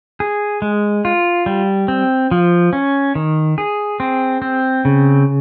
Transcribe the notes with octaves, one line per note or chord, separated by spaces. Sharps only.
G#4
G#3
F4
G3
C4
F3
C#4
D#3
G#4
C4
C4
C#3